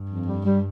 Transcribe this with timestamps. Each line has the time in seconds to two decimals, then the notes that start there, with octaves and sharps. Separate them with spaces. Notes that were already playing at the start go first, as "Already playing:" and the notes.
Already playing: G2
0.09 F2
0.27 G3
0.45 G3